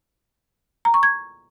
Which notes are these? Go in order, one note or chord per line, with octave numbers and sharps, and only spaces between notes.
A#5
C#6
G#6